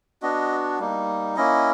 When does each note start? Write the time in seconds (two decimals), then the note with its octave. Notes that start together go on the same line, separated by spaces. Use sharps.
0.22 B3 D4 F#4 D#5
0.79 G3 A#3 D#4
1.36 A#3 C#4 E4 D#5